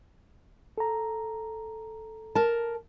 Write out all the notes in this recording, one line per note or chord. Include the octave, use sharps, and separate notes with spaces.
A4 A#5
A#4 A5